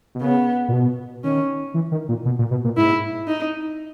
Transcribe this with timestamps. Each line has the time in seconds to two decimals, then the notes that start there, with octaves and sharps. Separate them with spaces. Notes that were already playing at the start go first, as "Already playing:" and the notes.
0.15 B2
0.21 C#3 B3
0.68 A#2
0.72 B2
1.24 D#3 C#4
1.74 E3
1.92 D#3
2.09 A#2
2.25 B2
2.39 A#2
2.51 B2
2.64 A#2
2.77 G#2 E4
3.28 D#4